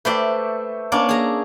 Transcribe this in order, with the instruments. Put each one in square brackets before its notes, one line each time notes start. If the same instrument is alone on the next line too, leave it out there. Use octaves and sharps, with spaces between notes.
[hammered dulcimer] A3 E5 G5 [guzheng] B4 C5 D5
[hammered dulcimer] A#3 [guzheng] C#4 D4 D5
[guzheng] G#4 A#5